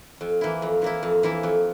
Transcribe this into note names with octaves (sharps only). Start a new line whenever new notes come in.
F2
E3 A#3 E4
F2
E3 A#3 E4
F2
E3 A#3 E4
F2